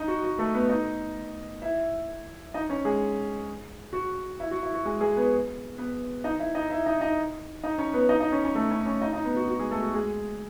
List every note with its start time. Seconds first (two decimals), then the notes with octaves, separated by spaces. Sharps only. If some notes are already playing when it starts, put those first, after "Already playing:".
Already playing: D#4 D#5
0.08 F#4
0.24 F#4
0.39 A3 A4
0.54 B3 B4
0.69 D#4 D#5
1.62 E4 E5
2.54 D#4 D#5
2.69 C#4 C#5
2.85 G#3 G#4
3.93 F#4
4.40 E4
4.51 F#4
4.63 E4
4.74 F#4
4.85 G#3 G#4
5.01 G#3 G#4
5.16 B3 B4
5.78 B3 B4
6.24 D#4 D#5
6.40 E4 E5
6.55 D#4 D#5
6.70 E4 E5
6.86 D#4 D#5
7.01 D#4 D#5
7.64 D#4 D#5
7.78 C#4 C#5
7.94 B3 B4
8.09 D#4 D#5
8.20 D#4 D#5
8.32 C#4 C#5
8.44 C#4 C#5
8.55 A3 A4
8.71 C#4 C#5
8.86 C#4 C#5
9.01 D#4 D#5
9.13 D#4 D#5
9.25 B3 B4
9.36 F#4
9.48 F#4
9.59 G#3 G#4
9.71 A3 A4
9.82 F#4
9.94 G#3 G#4